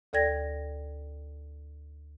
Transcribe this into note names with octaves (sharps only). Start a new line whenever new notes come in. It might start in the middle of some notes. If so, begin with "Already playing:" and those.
D2 A4 D5 G5 G#6 A#6